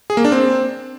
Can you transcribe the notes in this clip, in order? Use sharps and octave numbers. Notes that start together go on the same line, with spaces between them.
G#4
A#3
D4
C4